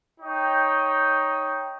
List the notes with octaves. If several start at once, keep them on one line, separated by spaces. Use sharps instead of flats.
D#4 C#5 G5